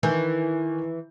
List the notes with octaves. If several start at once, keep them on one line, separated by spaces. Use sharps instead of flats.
D#3 E3 G#5 G6